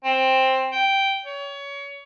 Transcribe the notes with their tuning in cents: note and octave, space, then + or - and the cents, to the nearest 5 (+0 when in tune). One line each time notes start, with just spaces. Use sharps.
C4 +10
G5 -5
C#5 +25